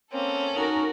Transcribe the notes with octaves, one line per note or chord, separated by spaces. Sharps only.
A#3 C4 C#4 A4
D#4 F#4 A#4 G#5 C#6